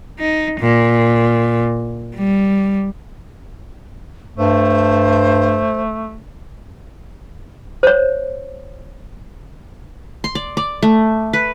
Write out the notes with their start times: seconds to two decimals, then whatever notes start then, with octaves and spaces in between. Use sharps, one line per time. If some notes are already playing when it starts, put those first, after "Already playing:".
0.19 D#4
0.60 A#2
2.16 G3
4.37 G2 A3 C5
7.83 C5 C#5
10.24 C6
10.35 D5
10.57 D5
10.82 A3
11.33 B4